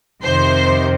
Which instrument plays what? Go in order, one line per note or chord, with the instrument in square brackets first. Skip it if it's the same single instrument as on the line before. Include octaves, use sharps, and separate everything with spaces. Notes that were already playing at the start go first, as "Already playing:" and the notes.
[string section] F2 C3 D#3 C5